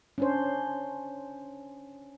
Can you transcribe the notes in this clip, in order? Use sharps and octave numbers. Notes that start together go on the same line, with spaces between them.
C#4 D4 C5